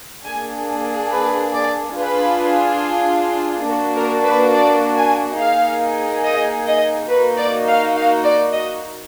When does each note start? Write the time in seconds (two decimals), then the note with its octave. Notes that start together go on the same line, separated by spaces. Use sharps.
0.24 A#3 D4 G#4 G#5
1.11 B4
1.53 D5
1.95 D4 F4 G#4 B4
3.67 A#3 D4 F#4 A#4
3.96 A#4
4.24 B4
4.53 D5
4.95 G#5
5.38 A#3 D#4 G#4 F5
6.23 D#5
6.67 D#5
7.09 A#3 D#4 F#4 B4
7.38 D5
7.67 F5
7.95 F5
8.24 D5
8.53 D#5